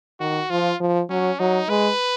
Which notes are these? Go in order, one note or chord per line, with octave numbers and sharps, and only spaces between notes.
D#3 F#4
F3 F4
F3
F#3 C#4
F#3 D#4
G#3 B4